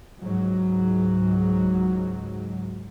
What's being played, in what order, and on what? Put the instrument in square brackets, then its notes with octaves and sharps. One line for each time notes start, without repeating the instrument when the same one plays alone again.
[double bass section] C#2 G#2 F#3